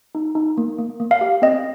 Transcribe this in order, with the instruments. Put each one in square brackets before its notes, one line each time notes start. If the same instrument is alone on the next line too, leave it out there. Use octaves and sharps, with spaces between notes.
[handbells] D#4
D#4
A#3
A#3
A#3
F5
G4
C4 D#5